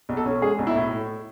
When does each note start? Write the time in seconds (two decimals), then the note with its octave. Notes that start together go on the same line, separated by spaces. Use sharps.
0.09 B1
0.17 A4
0.26 C#4
0.42 G#3 G#4
0.59 B1
0.67 E4
0.76 A2